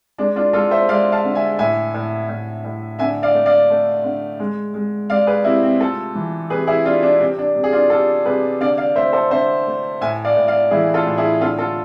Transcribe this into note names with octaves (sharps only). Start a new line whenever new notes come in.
G#3 D4
D4 F4
G#3 F4 A4
C5 E5
G#3 D5 F5
F5 A5
D3
E5 G#5
A2 E5 G#5
A2
A2
A2
D3 E5 G#5
D5 F5
A3
D5 F5
A3
D3
G#3
G#3
G#3 D5 F5
G#4 B4
C3 C4 E4
C4
A3 F4 A4
E3
C3 G#4 B4
E4 G#4
C3 D4 F4
D4
C3 C4
D4
C3
G#4
D4 F4
C3 F4 A4
C3 G#4 B4
D3 D5 F5
D5 F5
A3 C5 E5
A4 C5
D3 C5 E5
A3
A2 E5 G#5
D5 F5
A2
D5 F5
E3 E4 G#4
F4 A4
A2
E4 G#4
D3 F4 A4
F4 A4